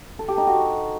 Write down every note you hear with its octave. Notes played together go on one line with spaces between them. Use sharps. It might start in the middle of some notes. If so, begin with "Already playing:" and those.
A4
G4
D#4
F#4